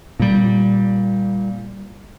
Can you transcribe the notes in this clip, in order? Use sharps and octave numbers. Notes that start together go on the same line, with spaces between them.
A#2 G3